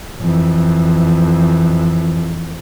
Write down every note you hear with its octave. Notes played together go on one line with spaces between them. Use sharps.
F2 E3